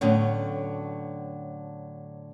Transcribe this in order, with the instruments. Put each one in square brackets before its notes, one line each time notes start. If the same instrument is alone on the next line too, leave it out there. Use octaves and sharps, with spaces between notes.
[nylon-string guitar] A2 D3 F#3 B3 C#4